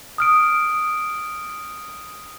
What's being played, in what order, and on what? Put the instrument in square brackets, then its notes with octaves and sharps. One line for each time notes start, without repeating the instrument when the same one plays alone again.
[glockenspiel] D#6 F6 D7